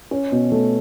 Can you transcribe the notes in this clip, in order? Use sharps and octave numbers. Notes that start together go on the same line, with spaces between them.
C#4
B2
A3